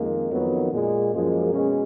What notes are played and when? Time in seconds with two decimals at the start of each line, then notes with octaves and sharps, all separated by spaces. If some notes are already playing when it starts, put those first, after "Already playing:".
Already playing: F2 D#3 G#3 A#3
0.31 F2 D#3 F#3 B3
0.72 A#2 G#3 A#3
1.13 F#2 F3 G#3
1.53 B2 G#3 C#4